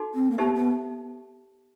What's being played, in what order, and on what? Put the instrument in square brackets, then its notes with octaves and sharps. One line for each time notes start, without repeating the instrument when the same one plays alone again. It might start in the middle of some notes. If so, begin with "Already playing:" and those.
Already playing: [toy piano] D#4 F#4 A4
[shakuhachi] C4
A#3
[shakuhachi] B3 [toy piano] D#4 G4 C5 E5 A5
[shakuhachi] B3